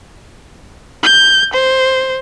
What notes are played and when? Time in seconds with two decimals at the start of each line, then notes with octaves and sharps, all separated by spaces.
1.03 G6
1.53 C5